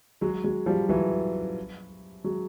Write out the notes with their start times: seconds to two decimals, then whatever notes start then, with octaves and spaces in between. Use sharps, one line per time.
0.21 F#3 G#3
0.44 F#3 G#3
0.66 F3 G3
0.89 E3 F#3
2.24 F#3 G#3